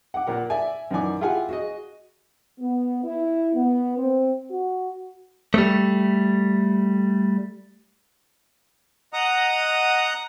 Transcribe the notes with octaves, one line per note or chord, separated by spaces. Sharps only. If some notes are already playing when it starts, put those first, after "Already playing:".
F#5 D6
A#2 A#4 F#5
D5 E5 G#5
F#2 D#3 E3 D5 G#5 D6
E4 F4 G4 G#4 F#5 G#5
F#4 G#4 D#5
B3
E4
B3
C4
F#4
G3 A3
D#5 F#5 A#5 D#6